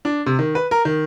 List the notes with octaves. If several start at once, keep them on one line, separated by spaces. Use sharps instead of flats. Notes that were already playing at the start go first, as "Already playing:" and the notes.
D4
C3
D#3
B4
A#4
D#3